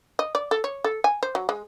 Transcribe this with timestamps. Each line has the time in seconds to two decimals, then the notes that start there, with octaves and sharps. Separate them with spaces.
0.19 D#5
0.35 D5
0.51 A4
0.64 C#5
0.84 A4
1.04 G#5
1.23 C5
1.35 F#3
1.49 G#3